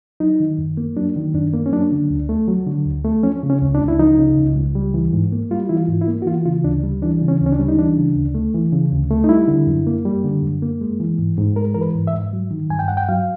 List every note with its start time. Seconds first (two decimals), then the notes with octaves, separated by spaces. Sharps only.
0.20 F#3 D#4
0.40 D#3
0.59 F#2
0.77 A#3
0.97 F#3 D4
1.16 D#3
1.34 F#2 D4
1.53 A#3
1.66 C#4
1.72 F#3 D4
1.92 D3
2.11 D2
2.29 A3
2.48 F#3
2.67 D3
2.86 D2
3.05 A3
3.23 F3 C#4
3.43 C#3
3.50 C#4
3.62 C#2
3.75 D4
3.81 C#2
3.88 E4
3.99 F3 D#4
4.18 C#3
4.37 C#2
4.56 C#2
4.75 G3
4.94 E3
5.13 G#2
5.32 A#3
5.51 G3 F4
5.69 E3 E4
5.77 F4
5.88 G#2
6.02 E4
6.08 A#3
6.22 F#4
6.26 E3 F4
6.46 C#3 F4
6.64 D2 D4
6.83 G3
7.02 E3 D4
7.22 C#3
7.28 C#4
7.40 D2
7.46 C#4
7.52 D4
7.59 G3
7.68 D#4
7.78 E3 D4
7.98 C#3
8.16 D2
8.35 A3
8.54 E3
8.73 C#3
8.92 D2
9.10 A3
9.24 D#4
9.29 G3 E4
9.48 D3
9.67 F#2
9.87 A#3
10.05 G3
10.24 D3
10.43 F#2
10.62 A#3
10.81 G#3
11.00 E3
11.18 G#2
11.37 G#2
11.56 G#3 A#4
11.75 E3 A#4
11.81 B4
11.95 G#2
12.07 E5
12.13 G#2
12.33 F#3
12.51 D#3
12.70 G2 G#5
12.79 G5
12.88 G2 F#5
12.97 G5
13.08 F#3 F5